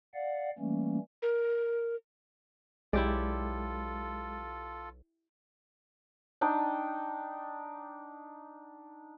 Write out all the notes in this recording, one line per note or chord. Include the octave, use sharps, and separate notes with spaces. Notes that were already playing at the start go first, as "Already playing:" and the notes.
D5 F5 F#5
E3 G3 A3 A#3 C#4
A#4
B1 G#3 E4 F4 G4 A4 D5
D4 D#4 G5